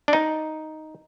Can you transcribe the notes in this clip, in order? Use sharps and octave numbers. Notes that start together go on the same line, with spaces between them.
D4
D#4